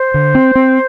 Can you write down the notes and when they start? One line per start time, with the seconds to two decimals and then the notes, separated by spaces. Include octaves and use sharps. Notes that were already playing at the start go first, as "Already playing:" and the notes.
Already playing: C5
0.14 D3
0.35 C4
0.55 C4